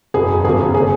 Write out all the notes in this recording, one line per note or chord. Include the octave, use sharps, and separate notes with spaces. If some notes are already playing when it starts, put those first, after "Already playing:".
F#1 E2 B2 G#4
G1 F2 D3 F#3 A#3 G#4
C#3 G#4